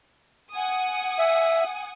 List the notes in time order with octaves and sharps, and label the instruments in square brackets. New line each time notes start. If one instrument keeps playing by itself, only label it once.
[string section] F#5 G#5 D#6
[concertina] E5